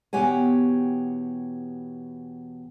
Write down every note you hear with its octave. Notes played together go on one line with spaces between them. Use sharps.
E2 B2 G4 C#5 F#5 G#5